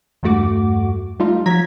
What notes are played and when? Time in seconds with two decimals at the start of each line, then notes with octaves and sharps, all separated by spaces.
0.23 E2 G2 A3 F#4 D6
1.20 G3 A3 D#4 F4
1.46 F3 F#3 A#5 G#6 B6